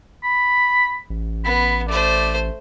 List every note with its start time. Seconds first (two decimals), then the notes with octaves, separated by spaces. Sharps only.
0.23 B5
1.10 A1
1.44 B3 B5
1.89 A3 C5 D5